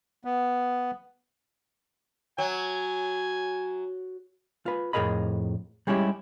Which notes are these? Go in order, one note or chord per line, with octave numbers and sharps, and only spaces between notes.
B3
F#3 G#5
F4 B4
F2 A2 G#4 A#4 D#5 B5
G3 G#3 C#4 E4 G4